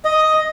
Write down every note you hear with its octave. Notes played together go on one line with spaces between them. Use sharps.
D#5